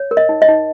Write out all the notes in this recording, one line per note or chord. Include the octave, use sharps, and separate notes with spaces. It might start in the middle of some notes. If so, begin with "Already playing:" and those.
Already playing: C#5
A#4
D#5
D#4
D#5
D#4